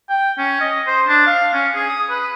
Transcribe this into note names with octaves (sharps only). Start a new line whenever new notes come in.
G5
C#4
D#5
C5
D4
F5
C#4
G#4
D#6
B4